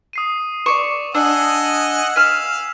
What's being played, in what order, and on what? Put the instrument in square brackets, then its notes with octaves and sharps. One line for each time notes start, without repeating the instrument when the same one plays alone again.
[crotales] D#6 C7 D#7
[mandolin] D5 C#6 [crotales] E7
[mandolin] D4 [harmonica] D#5 F#5 G#5 [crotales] E6
[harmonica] F5 [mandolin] G#5 F6 [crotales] B6 E7